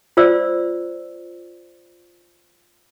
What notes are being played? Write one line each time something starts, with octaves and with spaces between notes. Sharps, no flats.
F4 C5 D5 E6